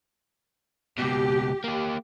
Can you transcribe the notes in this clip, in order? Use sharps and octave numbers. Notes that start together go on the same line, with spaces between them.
C#2 B2 G4
A#3 G4